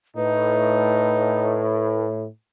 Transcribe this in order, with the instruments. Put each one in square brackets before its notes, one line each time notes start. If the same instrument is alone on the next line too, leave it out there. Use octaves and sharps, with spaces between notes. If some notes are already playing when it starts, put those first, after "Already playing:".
[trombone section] A2 [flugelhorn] D#4 [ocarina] B4